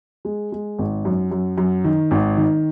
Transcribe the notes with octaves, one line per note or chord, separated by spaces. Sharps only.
G#3
G#3
G#1
F#2
F#2
F#2
D#3
G#1
D#3